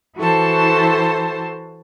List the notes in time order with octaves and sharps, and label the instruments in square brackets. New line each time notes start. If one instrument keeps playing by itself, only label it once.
[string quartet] E3 E4 F#4 A4 C5 A5